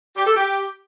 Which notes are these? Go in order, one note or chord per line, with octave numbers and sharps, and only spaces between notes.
G4
A4
G4